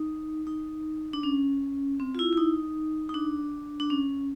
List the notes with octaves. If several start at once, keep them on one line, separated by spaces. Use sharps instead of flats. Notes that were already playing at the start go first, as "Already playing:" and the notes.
Already playing: D#4
D#4
D4
C#4
C4
F4
E4
E4
D#4
D#4
D4
D4
C#4